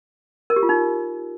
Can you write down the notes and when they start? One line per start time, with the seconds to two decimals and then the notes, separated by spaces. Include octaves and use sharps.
0.50 A#4
0.56 G4
0.63 F4
0.69 D#4